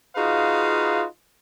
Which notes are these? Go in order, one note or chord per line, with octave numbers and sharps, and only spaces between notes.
D#4 F4 F#4 G#4 B4 F5